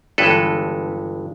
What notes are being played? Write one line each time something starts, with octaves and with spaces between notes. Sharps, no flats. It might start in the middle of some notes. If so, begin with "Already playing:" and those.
G1 G2 E3 G#3 A4 B4